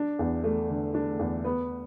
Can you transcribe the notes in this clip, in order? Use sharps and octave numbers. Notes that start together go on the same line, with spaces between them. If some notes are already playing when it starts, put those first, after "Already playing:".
Already playing: D4
E2
A3
D3
D4
E2
B3